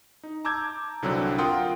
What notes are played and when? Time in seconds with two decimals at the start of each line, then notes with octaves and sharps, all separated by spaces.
0.23 D#4
0.45 A5 A#5 D6 E6 G6 G#6
1.02 C2 D3 F#3 C4 D4 F#6
1.38 F4 A#4 F#5 G5 C6 D#6